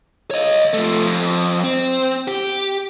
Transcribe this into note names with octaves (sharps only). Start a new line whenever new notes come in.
C#5 D#5
F3 A3
F2
C4
G4